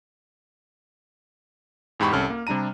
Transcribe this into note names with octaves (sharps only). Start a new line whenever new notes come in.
E2 G#2 G4 B5 C#6
C2 C#4 A4 F6
A#3
C3 G3 D4 A#5 D#7